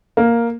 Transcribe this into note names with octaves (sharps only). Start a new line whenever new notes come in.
A#3